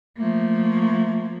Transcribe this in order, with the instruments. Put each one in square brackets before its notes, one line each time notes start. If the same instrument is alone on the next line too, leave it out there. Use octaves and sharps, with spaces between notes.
[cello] F3 A#3 [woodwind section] A3